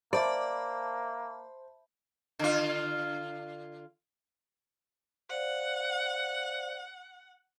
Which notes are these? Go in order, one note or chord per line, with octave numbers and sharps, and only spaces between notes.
A#3 C5 D5 E5 A5 B5
D3 F4
C5 D5 F5 F#5